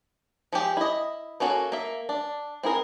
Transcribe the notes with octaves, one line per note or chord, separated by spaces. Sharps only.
F3 G#3 G4
E4 D#5
A#3 C#4 F#4 G#4 A4
A#3 E5
D4
C4 E4 G#4 A#4